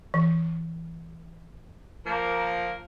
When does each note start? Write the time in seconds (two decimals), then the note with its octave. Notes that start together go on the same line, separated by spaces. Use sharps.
0.14 E3
2.06 F3 A#3 A#4